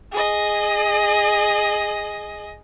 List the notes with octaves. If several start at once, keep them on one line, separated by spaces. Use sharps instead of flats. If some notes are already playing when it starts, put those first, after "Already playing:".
G#4 D#5